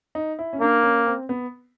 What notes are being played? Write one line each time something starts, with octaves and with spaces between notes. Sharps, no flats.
D#4
E4
C#4
A#3 D4
C#4
C4
B3